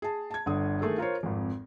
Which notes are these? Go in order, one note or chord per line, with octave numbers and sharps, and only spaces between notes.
G#4 A5
A5 G#6
G1 D3 D#6
D#3 A3 G#4 A4
F4 A#4 C5 C#5
G#1 F2